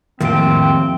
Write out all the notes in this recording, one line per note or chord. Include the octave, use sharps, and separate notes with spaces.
F2 A2 D#3 G#3 A#3 C4 G4 G5